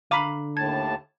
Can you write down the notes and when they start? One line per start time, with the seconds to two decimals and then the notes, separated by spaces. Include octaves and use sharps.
0.11 D3 F5 A#5 B5 D6 D#7
0.57 D#2 A2 A5 G#6